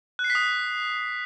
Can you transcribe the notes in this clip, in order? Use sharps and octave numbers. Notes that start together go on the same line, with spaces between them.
F#6
C7
B6
D#6